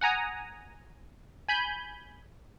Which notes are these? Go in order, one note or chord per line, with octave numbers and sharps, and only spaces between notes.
F#5 G#5 A#5 D#6
G#5 B5 G6